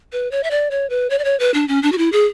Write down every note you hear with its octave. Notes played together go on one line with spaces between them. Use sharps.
B4
C#5
E5
D5
C#5
B4
C#5
D5
C#5
B4
D4
C#4
D4
F#4
E4
G#4